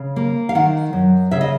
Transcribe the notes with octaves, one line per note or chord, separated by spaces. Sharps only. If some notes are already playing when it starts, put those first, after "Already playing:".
Already playing: C#3
A#3
F5
D#3 F#5
F#2
C#3 E5
D#5